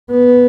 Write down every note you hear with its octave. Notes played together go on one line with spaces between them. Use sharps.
B3